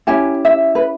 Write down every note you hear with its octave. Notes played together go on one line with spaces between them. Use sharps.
C#4 E4 G4 G#5
E5
B4